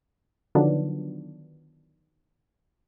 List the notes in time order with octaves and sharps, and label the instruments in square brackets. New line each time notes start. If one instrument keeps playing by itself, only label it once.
[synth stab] D3 D#3 F3 F#3 B3 D4